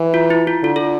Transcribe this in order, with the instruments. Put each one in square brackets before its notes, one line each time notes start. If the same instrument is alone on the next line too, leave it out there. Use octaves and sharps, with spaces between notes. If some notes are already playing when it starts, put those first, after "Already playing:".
Already playing: [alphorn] E3
[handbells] F4
E4
F4
[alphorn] D3 [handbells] F4
[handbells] A4